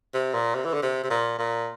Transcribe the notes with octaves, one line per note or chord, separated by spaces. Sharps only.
C3
A#2
C3
E3
D3
C3
C3
A#2
A#2